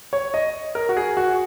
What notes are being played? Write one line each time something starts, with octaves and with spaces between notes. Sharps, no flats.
C#5
D#5
A#4
F#4
G#4
F#4